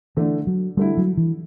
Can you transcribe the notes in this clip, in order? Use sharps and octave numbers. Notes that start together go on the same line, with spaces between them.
D3 E3 A3 D4
F#3
D3 G3 A3 E4
F#3
E3